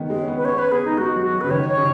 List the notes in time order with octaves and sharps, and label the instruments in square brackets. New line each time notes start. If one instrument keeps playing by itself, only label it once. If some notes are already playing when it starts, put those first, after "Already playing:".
Already playing: [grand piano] D#3 G#3 B3 C#4
G#3
C#4
B3
[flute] B4
[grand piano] C#4 [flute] C#5
[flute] B4
[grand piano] B3 [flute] G#4
[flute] D#4
[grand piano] G#3 [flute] F#4
[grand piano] F#3
F#3
[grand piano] C#3 [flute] B4
[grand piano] D#3 [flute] C#5
[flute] C#5
[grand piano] C#3